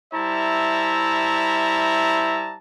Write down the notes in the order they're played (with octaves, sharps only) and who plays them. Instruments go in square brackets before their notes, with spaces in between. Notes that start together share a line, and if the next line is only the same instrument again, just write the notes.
[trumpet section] G3 E4 C5 E5 A5 A#5